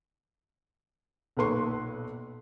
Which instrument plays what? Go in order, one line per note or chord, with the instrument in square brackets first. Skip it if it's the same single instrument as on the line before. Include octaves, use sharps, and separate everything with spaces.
[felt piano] B1 A#2 B4 C6 C#6